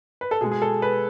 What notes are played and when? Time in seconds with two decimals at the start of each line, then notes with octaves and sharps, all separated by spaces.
0.21 B4
0.31 A4
0.41 B2 G#3 G#4
0.51 G#4
0.62 A4
0.82 B4